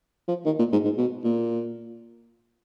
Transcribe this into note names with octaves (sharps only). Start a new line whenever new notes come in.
F3
D#3
A#2
G#2
G#2
B2
A#2